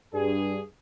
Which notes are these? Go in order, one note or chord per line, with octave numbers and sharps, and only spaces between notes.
G2 G#4